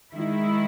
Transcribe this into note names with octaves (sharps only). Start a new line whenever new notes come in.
D#3 G#3 E4